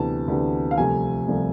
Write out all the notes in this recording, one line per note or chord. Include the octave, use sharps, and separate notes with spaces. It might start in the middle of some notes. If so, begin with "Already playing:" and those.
Already playing: D2 C3 E3 B3 A5
D2 C3 E3 B3
F5
C2 C3 F3 A3 G#5
C2 C3 F3 A3